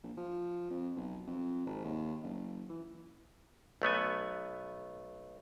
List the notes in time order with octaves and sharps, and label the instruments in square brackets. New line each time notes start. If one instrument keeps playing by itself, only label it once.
[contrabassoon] A#1
F3
F2
B1
F2
G#1
D#2
F#1
E3
[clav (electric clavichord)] B1 A3 B3 G#5